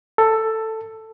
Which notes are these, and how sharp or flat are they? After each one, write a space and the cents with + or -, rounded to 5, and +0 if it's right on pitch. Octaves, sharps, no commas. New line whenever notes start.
A4 +10